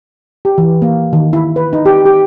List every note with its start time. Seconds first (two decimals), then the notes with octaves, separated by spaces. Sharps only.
0.45 G4
0.58 E3
0.82 A#3
1.13 D#3
1.33 E4
1.56 B4
1.73 D#4
1.86 G4
2.06 G4